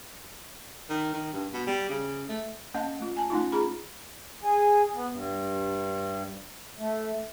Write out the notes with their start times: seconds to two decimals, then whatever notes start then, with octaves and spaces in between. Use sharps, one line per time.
0.89 D#3
1.13 D#3
1.33 G2
1.53 B2
1.67 G3
1.89 C#3
2.29 A3
2.74 A#3 C#4 D#5 F5 F#5 A5
2.99 A3 F4
3.17 G#5 A5
3.30 A3 C#4 D#4 F4
3.52 F4 G#4 A#5 B5
4.42 G#4
4.94 B3
5.10 G2
6.78 A3